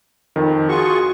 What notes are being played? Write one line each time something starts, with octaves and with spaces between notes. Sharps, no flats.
F2 D#3
F4 F#4 G#4 C#6